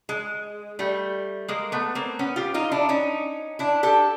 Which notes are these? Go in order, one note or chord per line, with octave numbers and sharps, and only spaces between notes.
G#3
G3 A3
G#3 A#3
A3 B3
A#3 C4
B3 C#4
F4 G4
D#4 F4
D4 E4
C#4 D#4
D4 E4
G4 A4